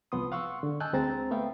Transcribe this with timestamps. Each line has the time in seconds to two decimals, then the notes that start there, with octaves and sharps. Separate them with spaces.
0.12 C2 F3 B3 C6 D#6
0.32 F5 F#5 C6 C#6 E6
0.63 D3
0.80 D#5 G#5 A5 E6 F#6 G6
0.93 D2 G#3 C4 C5 A#5 A6
1.31 A3 B3 E5 F5 G5